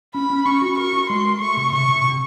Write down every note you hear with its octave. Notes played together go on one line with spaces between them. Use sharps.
C#4 B5
C#4
C#4 C#6
F#4
A#4 C#6
F#4
G#3 C6
A#4
A3 C#6
C3
C3 C#6
C3
C3